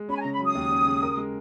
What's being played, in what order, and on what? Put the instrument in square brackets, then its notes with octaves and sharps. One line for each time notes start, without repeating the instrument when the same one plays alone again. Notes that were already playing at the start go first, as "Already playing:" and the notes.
Already playing: [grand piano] G#3
[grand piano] C#4 [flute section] B5
[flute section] G#5
A#5
[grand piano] C#3
[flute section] B5
[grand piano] F#3
[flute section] D#6
[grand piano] D#2
C#4
C#3
A#4
G#3